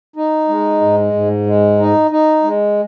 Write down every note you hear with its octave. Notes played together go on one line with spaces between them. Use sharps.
D#4
G#3
G#2
G#2
G#3
D#4
D#4
G#3